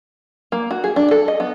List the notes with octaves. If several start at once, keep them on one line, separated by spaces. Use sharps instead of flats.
A#3
F#4
G#4
D4
A4
D#5
B3